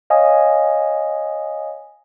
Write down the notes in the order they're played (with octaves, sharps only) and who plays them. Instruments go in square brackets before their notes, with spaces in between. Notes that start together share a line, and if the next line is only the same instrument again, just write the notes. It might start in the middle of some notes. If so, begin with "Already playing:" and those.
[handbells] C#5 D#5 F5 G#5 D#6